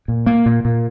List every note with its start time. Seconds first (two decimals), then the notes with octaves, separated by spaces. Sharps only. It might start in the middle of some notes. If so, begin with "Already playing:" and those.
0.08 A#2
0.26 A#3
0.46 A#2
0.65 A#2